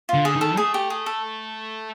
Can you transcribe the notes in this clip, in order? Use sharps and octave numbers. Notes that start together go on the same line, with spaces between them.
D3 F4
G#4
D#3
A4
A3 G#4
G4
G#4
A4